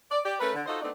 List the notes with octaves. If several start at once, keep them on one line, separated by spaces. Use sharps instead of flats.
D5
G4 D5
A3 C#4 A#4 B4
D3
D#4 F4 F#4 A4 C5 D#5
A3 B3 C4 D4 D#4